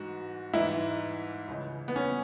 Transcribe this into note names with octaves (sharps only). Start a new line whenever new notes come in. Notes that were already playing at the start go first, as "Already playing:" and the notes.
Already playing: G#2 E3 F#4
G#2 E3 E4
C#2 C#3 E3
B3
C#4